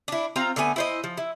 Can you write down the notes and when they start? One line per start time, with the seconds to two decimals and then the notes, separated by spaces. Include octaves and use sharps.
0.08 D4 E4
0.36 C4 F4 F5 A#5
0.56 D3 A3 B3 G#5
0.76 E4 C5 D#5
1.04 F3
1.17 E4